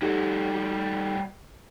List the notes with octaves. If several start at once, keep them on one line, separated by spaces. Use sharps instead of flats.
G3 D#4 F#4 G4 A4